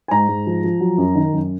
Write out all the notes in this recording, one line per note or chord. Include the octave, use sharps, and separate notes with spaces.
G#5
G#2 A#5
G#2
F3
F3
F#3
F#2
D#3
F#2